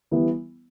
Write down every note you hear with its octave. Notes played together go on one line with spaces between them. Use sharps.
E3 G3 B3 E4